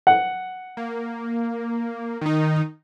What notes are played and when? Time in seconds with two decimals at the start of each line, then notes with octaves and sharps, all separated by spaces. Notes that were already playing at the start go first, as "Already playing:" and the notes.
0.07 F#5
0.77 A#3
2.21 D#3 D#4